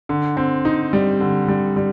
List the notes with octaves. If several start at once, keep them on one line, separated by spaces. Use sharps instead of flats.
D3
C4
D#4
G3
D3
G3
G3